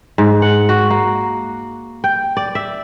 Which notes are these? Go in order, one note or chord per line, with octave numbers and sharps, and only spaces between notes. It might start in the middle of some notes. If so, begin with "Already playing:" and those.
G#2
F#5
F#4
A#3
G5
D5
E5